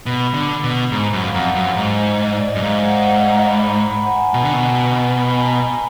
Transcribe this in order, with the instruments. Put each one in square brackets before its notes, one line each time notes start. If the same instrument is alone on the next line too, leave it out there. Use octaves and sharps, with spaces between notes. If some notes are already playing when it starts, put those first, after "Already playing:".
[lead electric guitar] B2 [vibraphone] B5
[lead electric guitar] D3
B2
[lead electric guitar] G#2 [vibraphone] A#5
[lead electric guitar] F#2
[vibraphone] F5
[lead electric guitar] F2 [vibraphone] F#5
[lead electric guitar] F#2
[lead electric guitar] G#2 [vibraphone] D#5
[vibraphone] D5
D#5
[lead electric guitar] F#2
[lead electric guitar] G#2 [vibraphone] F5
[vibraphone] F#5
F#5
A#5
B5
A#5
B5
F#5
G#5
[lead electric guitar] B2
D3
B2
[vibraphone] B5
G#5
A#5
G#5